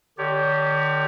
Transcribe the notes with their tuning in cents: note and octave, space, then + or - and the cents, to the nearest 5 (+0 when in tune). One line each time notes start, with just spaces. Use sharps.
D3 +40 G4 +0 C#5 +30